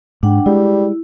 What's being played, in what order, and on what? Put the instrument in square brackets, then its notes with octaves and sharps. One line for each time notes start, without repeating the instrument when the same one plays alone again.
[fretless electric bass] G#2 [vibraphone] D4 F#5 G5
[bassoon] G3 [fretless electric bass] G#3 [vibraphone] E4